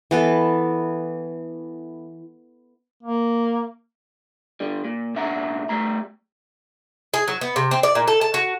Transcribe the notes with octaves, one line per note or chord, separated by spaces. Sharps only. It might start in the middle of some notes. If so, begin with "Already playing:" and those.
E3 B3 A4
A#3
D3 G3
A#2
C2 A#2 D4 E5 F#5 A#5
G3 A3 A#5
G#4
F#3
B3
C3
C4
D5
A#2
A4
A5
F#4